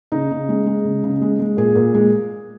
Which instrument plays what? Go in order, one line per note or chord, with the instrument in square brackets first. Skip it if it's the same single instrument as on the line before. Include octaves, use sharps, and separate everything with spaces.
[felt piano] C#3 D#4
C#3
G#3
G#3
C#3
C#3
G#3
G#3
A#2 G#4
A#2
G#3